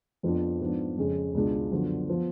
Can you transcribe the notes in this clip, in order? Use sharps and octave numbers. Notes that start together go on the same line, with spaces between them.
F2 F3 B3 D4 F4
G#2 F3 B3 D4
F2 C#3 G#3 C#4
C#2 B2 G#3 D4 F4
F#2 D3 F3 B3 F#4
F3 B3